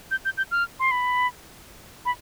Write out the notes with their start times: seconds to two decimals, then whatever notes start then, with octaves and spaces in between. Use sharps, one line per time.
0.11 G6
0.25 G6
0.37 G6
0.51 F6
0.80 C6
0.91 B5
2.05 B5